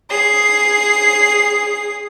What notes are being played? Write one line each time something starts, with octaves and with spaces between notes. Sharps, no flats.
G#4 C7